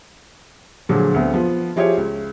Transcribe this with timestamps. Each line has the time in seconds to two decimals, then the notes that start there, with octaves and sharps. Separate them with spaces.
0.89 A#2 D3 F3 F#3 G#3
1.14 D2 B3 C4
1.33 F3 B3 F4
1.76 F3 E4 F4 G4 G#4 C#5
1.97 C#2